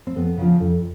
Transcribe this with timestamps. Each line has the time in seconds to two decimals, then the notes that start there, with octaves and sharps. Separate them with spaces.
0.07 C4
0.16 F2 B3
0.38 C#3 F3
0.60 F2